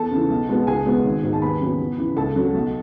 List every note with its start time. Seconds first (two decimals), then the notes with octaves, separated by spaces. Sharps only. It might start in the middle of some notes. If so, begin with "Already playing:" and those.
Already playing: E2 A4 A5
0.11 C#3 E3
0.30 B1
0.49 B2 G#3 B3
0.67 C#2 G#4 G#5
0.86 B2 G#3 B3
1.05 G#1
1.23 G#2 D#3 G#3
1.33 A5
1.42 D#2 B4 B5
1.60 C#3 F#3 B3
1.80 E2
1.98 C#3 E3
2.16 C#2 A4 A5
2.35 C#3 F#3 A3
2.54 B1